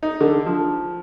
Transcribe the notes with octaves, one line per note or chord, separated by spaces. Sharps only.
D#4
D3
F3